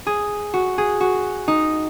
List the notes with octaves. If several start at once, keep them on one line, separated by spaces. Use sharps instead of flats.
G#4
F#4
G#4
F#4
D#4